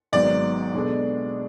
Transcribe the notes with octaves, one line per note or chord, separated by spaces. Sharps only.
G#1 G#2 F#3 B3 D5
B2 G#3 B3 D4 A4